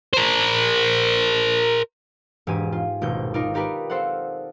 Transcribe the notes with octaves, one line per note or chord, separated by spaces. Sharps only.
A#4 C5
E1 G#2 G4 G#5 D#7
F4
D#1 G#1 B2 G6
D#4 F4 A#4 D5
D#4 G4 A#4 B4 D5
C4 A4 C5 F5 F#5